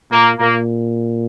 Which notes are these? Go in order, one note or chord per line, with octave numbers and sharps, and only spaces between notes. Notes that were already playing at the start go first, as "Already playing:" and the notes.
A#2 A#3
A#2 A#3